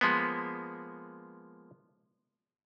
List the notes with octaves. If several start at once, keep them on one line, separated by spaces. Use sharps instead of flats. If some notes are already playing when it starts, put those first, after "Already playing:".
F3 G#3 A#3 B3